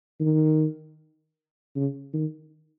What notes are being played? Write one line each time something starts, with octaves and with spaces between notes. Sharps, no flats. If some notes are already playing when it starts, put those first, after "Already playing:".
D#3
C#3
D#3